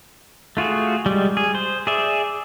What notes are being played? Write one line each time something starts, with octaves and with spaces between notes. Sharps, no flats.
A3 F4 F#4 G#4
G3 G#3
G#4
C5
G#4 D5 E5